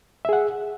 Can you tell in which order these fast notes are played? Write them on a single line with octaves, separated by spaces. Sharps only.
E5 G#4 F#5